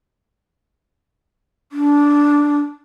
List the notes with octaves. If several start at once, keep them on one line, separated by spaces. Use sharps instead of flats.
D4